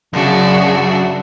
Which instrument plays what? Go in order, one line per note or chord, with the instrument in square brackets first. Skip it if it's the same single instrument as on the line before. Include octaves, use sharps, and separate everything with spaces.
[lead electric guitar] F#2 [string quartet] C#3 D4 F#4 [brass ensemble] F#3 D5 A5